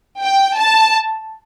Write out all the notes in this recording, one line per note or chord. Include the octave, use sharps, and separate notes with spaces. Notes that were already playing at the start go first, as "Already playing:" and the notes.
G5
A5